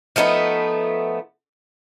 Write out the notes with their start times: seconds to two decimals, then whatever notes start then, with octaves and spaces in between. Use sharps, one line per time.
0.16 F3 A3 B3 D#4